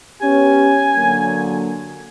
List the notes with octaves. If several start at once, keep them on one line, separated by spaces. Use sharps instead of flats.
B3 C#4 G4 G#5
D3 F#3 A#3